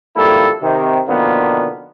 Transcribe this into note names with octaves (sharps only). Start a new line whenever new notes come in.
G#1 F3 G3 A#3 E4 A4
C3 D#3
B2 D3 D#3 F3 A#3 B3